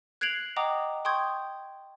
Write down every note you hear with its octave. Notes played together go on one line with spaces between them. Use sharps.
F#6 G#6 C7 D7 F7 F#7
D#5 F#5 G5 A#5 D6 D#6
G5 C6 C#6 D#6 G6 G#6